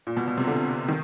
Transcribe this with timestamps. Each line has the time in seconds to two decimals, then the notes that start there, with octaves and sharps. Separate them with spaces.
0.07 A#2
0.17 B2
0.28 B2
0.38 C3
0.47 D3
0.88 D#3